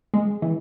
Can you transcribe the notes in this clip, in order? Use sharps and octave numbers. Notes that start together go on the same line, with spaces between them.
G#3
E3